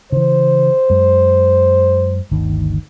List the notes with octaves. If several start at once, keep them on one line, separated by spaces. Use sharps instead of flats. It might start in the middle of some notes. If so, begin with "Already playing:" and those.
C#3 E3 C5
F#2 G#3
G1 D2 D#3